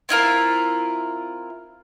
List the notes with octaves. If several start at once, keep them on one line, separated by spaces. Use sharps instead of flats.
C4 E4 F4 A#4